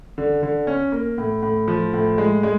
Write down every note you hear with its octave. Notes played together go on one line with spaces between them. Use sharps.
D3
D3
C#4
A#3
A2
A2
F3
A2
G#3
G#3